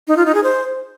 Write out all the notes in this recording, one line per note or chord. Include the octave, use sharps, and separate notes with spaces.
D#4
F4
D#4
G#4
C5